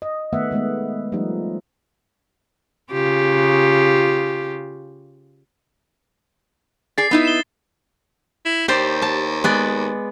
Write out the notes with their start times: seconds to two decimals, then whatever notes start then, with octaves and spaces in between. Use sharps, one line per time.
0.02 D#5
0.33 D#3 A3 B3 E5 F#5
0.51 D#3 G#3 A3 B3
1.12 F3 G3 A3 D#4
2.92 C#3 F4 G4
6.98 G#4 D5 A6 C7
7.11 B3 D#4 E4
7.25 E7 G7
8.46 E4
8.68 D#2 G4 C5 D5
9.02 A5
9.44 G#3 B3 D5